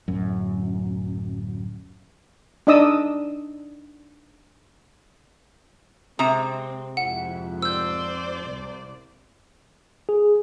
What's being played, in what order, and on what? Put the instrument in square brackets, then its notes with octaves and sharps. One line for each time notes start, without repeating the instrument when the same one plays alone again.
[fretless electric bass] D1 F#2
[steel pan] D4 D#4 D5 D#5 D#6 E6
[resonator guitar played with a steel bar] C3 A#5 [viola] G#3 C4 [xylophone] D#6
[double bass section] F2 G#2 [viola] E4 [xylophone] F#5
[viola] C5 D5 [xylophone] E6 G6
[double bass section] C2
[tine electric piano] G#4